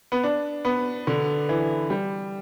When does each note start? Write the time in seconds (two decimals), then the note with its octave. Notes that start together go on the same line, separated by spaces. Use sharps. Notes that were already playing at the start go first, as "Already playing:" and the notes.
0.12 B3
0.23 D4
0.65 B3
1.07 D3
1.49 E3
1.90 G3